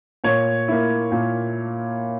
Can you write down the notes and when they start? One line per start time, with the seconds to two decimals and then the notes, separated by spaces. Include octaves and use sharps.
0.24 A#2 C#5
0.68 A#3 E4
1.12 A#2